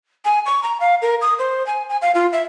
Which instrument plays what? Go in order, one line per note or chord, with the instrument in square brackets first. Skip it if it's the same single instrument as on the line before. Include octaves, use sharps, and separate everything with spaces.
[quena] G#5
C#6
A#5
F5
A#4
D#6
C5
G#5
G#5
F5
F4
E5